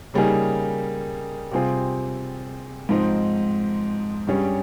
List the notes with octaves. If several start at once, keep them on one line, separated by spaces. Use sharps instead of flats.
C#3 G3 A#3 D#4 G#4
C3 G3 C4 F4 G#4
G#2 F3 C4 D#4
G2 G3 C#4 G#4